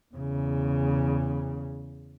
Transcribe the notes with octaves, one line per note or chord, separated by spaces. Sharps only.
E2 C#3